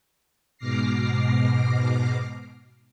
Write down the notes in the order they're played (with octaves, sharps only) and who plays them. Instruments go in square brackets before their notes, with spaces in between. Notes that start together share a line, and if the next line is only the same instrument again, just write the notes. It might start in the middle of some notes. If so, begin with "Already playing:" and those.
[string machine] G#2 B2 D6 F6 A#6 C7